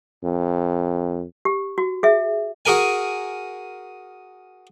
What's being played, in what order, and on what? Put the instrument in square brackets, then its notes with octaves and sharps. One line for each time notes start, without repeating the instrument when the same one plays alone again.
[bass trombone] F2
[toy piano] G4
F#4
G#4 E5
[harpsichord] F#4 G#4 A#4 G#5